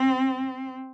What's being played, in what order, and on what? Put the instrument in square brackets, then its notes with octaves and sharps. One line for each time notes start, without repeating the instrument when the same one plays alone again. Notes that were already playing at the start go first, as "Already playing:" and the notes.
Already playing: [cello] C4